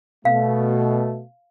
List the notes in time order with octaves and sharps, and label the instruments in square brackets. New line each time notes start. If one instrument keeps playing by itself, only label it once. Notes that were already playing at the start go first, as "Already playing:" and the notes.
[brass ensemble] B2 A3 [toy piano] F5